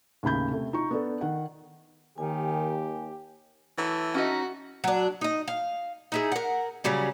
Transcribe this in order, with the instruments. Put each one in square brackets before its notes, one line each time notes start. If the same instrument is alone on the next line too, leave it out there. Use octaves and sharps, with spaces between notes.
[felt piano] D#2 A2 C#3 B5 G6
C3 A3
D#4 F4 C#6
B3 D4 A4
D#3 F#5
[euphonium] D#2 [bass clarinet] D#3 [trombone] G4 [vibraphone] G#5
[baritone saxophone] E3 [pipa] F#3 A3
[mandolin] C#4 D#4 [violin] F#4
[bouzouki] F#3 D4
D#4 D#5
F5
D#4 E4 G#4
A#4 F#5
C#3 F#3 G3 C#4